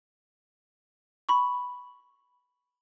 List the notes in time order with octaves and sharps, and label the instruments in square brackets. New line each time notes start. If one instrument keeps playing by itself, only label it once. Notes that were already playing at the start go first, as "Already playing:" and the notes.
[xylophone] B5 C#6